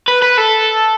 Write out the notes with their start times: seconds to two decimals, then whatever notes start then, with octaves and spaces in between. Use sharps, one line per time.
0.08 B4
0.22 B4
0.38 A4